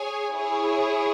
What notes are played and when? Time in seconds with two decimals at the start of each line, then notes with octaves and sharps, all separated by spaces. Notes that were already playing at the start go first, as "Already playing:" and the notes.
Already playing: G#4 C#5 G#5
0.34 E4 G#4 C#5